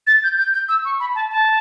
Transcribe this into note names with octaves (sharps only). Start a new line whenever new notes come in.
A6
G6
G6
G6
E6
C#6
B5
A5
A5